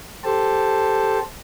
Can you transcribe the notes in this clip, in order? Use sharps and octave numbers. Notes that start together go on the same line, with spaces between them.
G4 A4 C5 A5